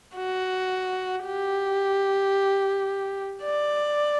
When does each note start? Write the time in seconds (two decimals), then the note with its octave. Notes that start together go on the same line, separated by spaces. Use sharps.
0.17 F#4
1.26 G4
3.44 D5